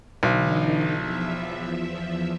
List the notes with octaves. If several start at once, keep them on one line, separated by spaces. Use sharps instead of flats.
B1 D3 E3 D#4
E2 F3 E5